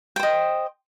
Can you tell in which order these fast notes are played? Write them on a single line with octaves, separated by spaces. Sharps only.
G5 C5 D#5